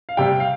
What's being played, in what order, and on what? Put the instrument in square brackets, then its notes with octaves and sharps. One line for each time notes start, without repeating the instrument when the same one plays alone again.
[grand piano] F5
C3 G3 G5
F5